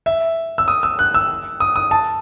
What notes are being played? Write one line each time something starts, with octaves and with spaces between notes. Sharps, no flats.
E5
E6
D#6
E6
F#6
E6
D#6
D#6
A5